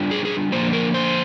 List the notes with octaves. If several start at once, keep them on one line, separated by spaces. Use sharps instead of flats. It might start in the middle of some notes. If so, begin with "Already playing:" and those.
Already playing: G3 D4 F4
G#4
G#4
D3 F3 A#3 C5
A#4
C5